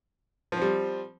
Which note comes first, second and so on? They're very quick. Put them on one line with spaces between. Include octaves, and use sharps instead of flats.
F3 C4 G3